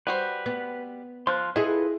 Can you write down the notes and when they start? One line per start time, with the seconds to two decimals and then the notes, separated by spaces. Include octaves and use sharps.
0.07 G3 F#4 B4 C5
0.46 B3
1.27 F3 C6 F6 F#6
1.56 E4 F4 G#4 A4 B4 D#5